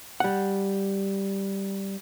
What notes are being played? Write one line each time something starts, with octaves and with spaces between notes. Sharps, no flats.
G3 F#5